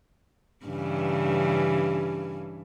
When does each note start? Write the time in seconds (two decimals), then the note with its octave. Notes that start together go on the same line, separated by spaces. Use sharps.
0.66 G2 C#3 E3